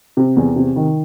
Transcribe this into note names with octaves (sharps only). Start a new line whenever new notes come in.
C3
E2
C3
D#3